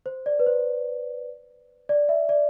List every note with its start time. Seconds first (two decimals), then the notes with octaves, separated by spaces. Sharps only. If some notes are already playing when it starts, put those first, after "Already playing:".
0.06 C5
0.26 D5
0.39 B4
0.47 C5
1.89 D5
2.09 E5
2.29 D5